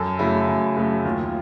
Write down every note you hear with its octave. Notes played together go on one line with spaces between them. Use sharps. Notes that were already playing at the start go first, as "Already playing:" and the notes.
Already playing: F#2 A4
C#3 F#3 A3 E4
F#2 E4
C#3 F#3 A3
D#2 F4